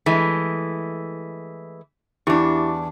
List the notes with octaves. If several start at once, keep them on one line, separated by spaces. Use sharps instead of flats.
E3 G#3 A3 B6
E2 D4 E4 G4 C#6